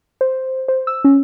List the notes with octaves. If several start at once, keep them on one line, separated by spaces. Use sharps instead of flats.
C5
C5
E6
C#4